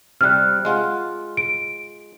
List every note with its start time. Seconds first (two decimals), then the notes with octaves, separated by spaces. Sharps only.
0.21 C3 G3 F6 F#6
0.65 G#3 F4 F#5
1.37 D7